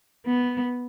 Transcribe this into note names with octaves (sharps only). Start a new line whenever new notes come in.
B3